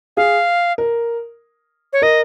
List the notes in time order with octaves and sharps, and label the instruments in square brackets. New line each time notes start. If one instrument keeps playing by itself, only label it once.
[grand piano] G#4 [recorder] F5
[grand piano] A#4
[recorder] C#5
[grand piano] A#4 [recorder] D#5